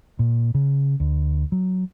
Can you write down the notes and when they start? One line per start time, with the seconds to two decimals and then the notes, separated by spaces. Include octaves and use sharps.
0.19 A#2
0.54 C#3
1.00 D2
1.52 F#3